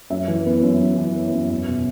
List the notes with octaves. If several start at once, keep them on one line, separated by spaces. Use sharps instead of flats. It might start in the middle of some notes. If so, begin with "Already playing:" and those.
F#2 E5
E3
B3
F#2
F#2
E3
B3
F#2
E2 E5
B2